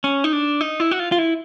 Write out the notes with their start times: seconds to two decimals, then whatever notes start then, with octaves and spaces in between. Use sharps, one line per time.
0.04 C#4
0.24 D#4
0.33 D4
0.61 D#4
0.80 E4
0.91 F#4
0.99 F4
1.12 F4
1.18 E4